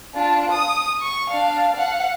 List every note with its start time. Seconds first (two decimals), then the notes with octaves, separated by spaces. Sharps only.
0.15 D4 F4
0.52 D#6
1.00 C#6
1.31 D4 F5
1.74 F5 F#5